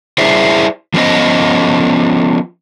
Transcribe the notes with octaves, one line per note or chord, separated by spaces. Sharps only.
E4 G#4 C5 D5 E5
F3 B3 C#4 C5 D#5